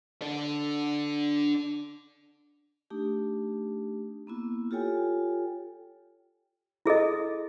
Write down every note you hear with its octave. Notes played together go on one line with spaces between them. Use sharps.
D4 A4
A3 D4 D#4 G4
A#3 B3 E4
F4 G4 A4 C#5 G5 G#5
E4 G#4 A4 D#5